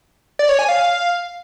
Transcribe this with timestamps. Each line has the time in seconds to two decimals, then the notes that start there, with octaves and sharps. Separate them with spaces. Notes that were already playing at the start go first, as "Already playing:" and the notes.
0.39 D5
0.49 C#5
0.59 G#5
0.69 F5